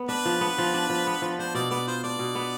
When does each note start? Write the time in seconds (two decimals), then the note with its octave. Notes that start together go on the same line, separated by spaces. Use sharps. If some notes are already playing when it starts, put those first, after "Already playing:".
Already playing: B3
0.09 D4 B4
0.25 F3
0.41 B3
0.58 F3
0.74 D4
0.90 F3
1.07 B3
1.22 F3
1.39 D4 C5
1.55 B2 D5
1.71 B3 D5
1.87 F4 C5
2.04 D4 D5
2.19 B2
2.35 B3